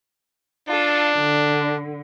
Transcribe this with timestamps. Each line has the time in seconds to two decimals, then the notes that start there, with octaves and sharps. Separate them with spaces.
0.69 D4 F4 A4
1.18 D3